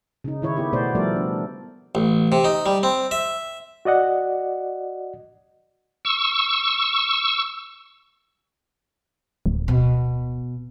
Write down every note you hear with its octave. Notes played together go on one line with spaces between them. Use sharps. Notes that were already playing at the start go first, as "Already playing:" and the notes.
C#3 D#4
D#3 E4 C#5
B3 E4 G4
B2 A3 B3 G#4 C5 D5
F3 G3 A3 A4 A#4 D5
D4
A1
C3
D#4
G3
C4
E5
F#4 D5 D#5 F#5
C#6 E6
D1
B2